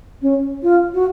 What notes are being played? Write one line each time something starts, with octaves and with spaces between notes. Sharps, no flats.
C#4
F4
F#4